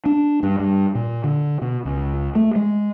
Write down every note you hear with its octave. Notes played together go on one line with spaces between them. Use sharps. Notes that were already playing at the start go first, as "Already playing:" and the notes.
D4
G2
G2
A#2
D3
B2
C#2
A3
G#3